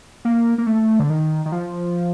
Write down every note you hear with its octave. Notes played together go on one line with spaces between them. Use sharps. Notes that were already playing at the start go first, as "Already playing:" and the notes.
A#3
A#3
A3
D3
D#3
D#3
F3